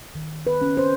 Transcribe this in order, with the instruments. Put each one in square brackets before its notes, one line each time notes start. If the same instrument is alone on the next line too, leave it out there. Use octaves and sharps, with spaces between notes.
[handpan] D#3
B4
C#4
C5